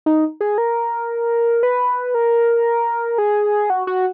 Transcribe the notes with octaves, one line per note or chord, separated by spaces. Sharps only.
D#4
G#4
A#4
B4
A#4
G#4
F#4
F#4